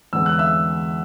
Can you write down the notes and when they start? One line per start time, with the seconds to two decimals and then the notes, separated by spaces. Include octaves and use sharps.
0.13 E2 D3 G#3 B3 E6
0.26 F#6
0.39 E5 E6